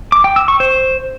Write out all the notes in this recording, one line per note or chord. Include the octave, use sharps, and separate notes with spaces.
D6
G5
E6
C#6
C5